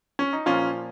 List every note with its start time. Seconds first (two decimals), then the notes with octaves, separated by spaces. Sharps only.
0.19 C#4
0.33 D#4
0.46 A#2 F3 A#3 C#4 F4